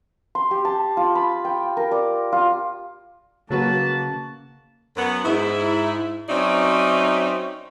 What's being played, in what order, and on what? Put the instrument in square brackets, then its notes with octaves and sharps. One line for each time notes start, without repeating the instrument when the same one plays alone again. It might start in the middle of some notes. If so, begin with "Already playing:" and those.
[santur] C6
G4
A5
F4
B5
G5
A#4
D5
F4
[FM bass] C#3 [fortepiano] F#3 F#4 B4 [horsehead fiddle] A#3 [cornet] A5
[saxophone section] F#2 B3 F#5
G#2 E4
F#3 C4 C#4 D#4 D5 E5